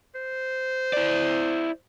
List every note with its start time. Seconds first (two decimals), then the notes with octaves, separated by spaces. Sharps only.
0.15 C5
0.93 E4 D5